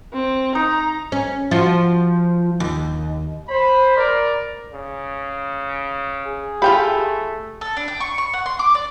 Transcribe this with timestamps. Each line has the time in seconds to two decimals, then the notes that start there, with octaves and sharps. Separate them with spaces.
0.13 C4
0.55 D#4 A#5
1.12 C#4
1.51 F3 F4 F#4
2.60 D#2
3.48 C5 B5
3.97 A#4 D5
4.73 C#3
6.26 G#4
6.62 A3 F4 G4 G5 B5
7.61 A4
7.77 D4
7.88 G5
8.00 C#6
8.18 C#6
8.33 F#5
8.46 C6
8.59 D6
8.75 D5